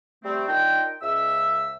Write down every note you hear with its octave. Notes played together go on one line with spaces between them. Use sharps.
G3 A3 C4
D4 D#4 F4 A#4 G5
C#2 E5 E6